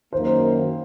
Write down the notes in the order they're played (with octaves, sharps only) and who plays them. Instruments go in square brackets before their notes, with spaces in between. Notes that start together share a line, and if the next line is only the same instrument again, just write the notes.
[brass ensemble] F#2 D#3 A#3 [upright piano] C5